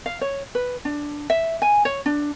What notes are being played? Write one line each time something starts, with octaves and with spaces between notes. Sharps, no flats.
F5
C#5
B4
D4
E5
G#5
C#5
D4